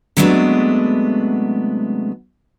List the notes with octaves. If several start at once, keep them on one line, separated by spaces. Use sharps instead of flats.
C3 F#3 G#3 A3 B3 D4